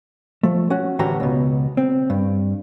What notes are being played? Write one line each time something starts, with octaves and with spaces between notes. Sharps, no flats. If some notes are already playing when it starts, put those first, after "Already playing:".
F3 A3
C#4 F#4
D2 A2 E3 F#4 G4 A#5
C#2 B2
C4
G2